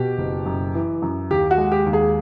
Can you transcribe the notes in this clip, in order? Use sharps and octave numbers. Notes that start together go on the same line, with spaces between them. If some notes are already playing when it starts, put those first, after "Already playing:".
Already playing: B2 G4
F#1
F#2
E3
F#2
D#2 G4
F#4
G#3
G4
D#2
G#4